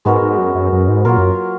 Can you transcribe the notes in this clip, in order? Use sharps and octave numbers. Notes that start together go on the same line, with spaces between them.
G#2 G#3 B3 F#4 A#4
G#2
F#2
F#2
F#2
G#2
A#2 F#3 A#3 F4 A#4
F#2